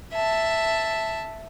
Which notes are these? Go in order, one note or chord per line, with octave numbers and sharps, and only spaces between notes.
E5 A5